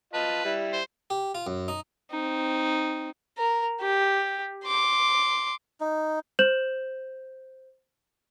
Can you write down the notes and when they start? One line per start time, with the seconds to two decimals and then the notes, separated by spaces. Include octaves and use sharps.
0.13 F4 B4 D#5 A5
0.45 G3 E4 D5
0.73 C5
1.10 G4
1.35 F4
1.47 F#2
1.68 D#4
2.11 C4 D#4
3.38 A#4
3.81 G4
4.66 C6 D6
5.80 D#4
6.39 C5 G6 E7 F#7